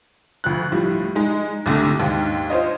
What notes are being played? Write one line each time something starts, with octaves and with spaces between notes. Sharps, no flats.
D2 F3 F#6
A2 F3 G3
G#3 D#4
C2 D3 A3
D#2 G#2
F4 C5 C#5 D#5